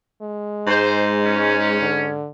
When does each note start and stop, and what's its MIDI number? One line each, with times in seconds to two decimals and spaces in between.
0.22 1.77 56
0.67 2.26 44
0.67 1.05 72
1.22 2.11 61
1.81 2.29 50